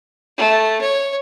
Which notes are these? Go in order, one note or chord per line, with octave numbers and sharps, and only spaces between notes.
A3
C#5